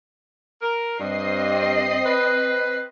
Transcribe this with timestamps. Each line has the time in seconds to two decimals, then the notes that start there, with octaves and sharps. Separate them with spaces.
0.62 A#4
0.99 G2 C4 D#5 C7
2.06 B4